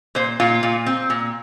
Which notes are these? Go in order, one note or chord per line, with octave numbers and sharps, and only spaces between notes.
A#2 C5
A#2 F4
A#2
C4
A#2